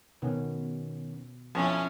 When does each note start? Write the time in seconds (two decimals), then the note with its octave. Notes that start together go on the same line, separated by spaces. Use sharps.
0.22 B2 D#3 B3 C#4
1.55 F2 B3 C#4 E4